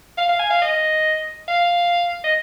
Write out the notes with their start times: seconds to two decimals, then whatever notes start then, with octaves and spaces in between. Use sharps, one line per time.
0.17 F5
0.29 F5
0.39 G#5
0.50 F5
0.62 D#5
1.48 F5
2.24 D#5